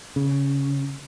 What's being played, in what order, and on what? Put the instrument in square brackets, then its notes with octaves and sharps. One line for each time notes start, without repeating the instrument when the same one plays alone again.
[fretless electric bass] C#3